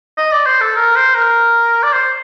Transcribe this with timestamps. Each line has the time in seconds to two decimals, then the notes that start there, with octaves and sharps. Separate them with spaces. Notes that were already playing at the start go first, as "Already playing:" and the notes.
0.17 D#5
0.31 D5
0.46 C5
0.61 A4
0.76 A#4
0.96 C5
1.14 A#4
1.83 D5
1.93 C5